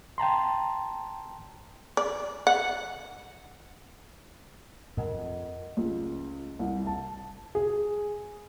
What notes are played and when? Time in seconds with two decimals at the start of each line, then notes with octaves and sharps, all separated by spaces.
0.18 G5 A5 A#5 C6
1.97 D5
2.47 F#5
4.97 F2 A#4 D#5 F#5
5.77 C#2
6.59 C2
6.87 A5
7.55 G#4